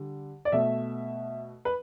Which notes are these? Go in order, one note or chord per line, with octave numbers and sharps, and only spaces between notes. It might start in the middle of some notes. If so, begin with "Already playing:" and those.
Already playing: D3 G3
D5
B2 A3 E5
B4